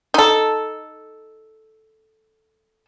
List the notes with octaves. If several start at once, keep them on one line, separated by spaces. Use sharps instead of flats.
D#4 A4